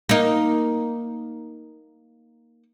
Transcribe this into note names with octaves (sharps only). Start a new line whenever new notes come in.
A#3 D#4